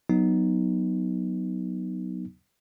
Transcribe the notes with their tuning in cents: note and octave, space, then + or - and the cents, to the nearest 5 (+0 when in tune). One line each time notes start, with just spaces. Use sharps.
F#3 +0 B3 +0 D#4 +0